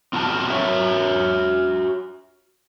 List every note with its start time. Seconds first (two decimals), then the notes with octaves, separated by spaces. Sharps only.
0.13 C4 F4 F#4 A5
0.50 F#4 C#5 E5